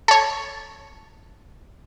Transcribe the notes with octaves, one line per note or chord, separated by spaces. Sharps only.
A4 C#5